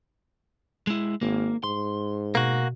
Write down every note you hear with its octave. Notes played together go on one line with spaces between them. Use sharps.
G#3 E4
G#1 A#3
G#2 C6
B2 A#3 F#4